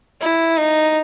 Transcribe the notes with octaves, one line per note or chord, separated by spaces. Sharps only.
E4
D#4